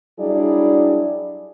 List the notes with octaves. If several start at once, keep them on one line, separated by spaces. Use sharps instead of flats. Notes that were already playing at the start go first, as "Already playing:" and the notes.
F#3 G3 D4 E4 G#4 D5